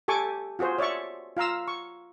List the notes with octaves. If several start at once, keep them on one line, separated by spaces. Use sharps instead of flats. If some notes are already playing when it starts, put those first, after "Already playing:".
G4 A4 G#5 C#6 D6
F4 F#4 G#4 C5
C#5 D5 E5 C#6
F4 F5 A#5 E6
C#6